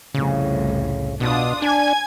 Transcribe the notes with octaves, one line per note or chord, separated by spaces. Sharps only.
C2 F2 A2 C#3
B2 D4 F4 D#6
D4 G#5 G#6